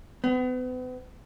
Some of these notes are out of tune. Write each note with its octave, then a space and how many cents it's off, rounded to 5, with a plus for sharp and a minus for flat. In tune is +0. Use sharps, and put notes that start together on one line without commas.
B3 +40